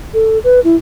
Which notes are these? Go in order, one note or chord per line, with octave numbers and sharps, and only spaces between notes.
A4
B4
E4